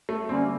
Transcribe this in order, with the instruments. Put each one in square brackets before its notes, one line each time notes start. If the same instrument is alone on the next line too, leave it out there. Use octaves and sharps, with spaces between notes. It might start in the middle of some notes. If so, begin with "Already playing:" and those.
[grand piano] A3
[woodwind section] D3 G3 A#3 C#4 [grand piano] C4